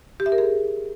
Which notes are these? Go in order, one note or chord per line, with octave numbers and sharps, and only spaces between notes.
G4
E5
A#4
G#4